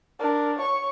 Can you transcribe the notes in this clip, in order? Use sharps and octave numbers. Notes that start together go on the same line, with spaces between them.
D4 A#4
C#5 C#6